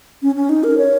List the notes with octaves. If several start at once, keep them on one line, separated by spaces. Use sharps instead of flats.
C#4
C#4
D#4
A#4
C#5